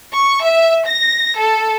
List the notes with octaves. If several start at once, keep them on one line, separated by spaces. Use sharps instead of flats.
C#6
E5
A#6
A4